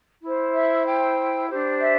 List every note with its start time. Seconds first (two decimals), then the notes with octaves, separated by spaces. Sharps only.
0.22 E4 C5
0.53 E5
0.85 G5
1.49 D4 G4 C5
1.80 E5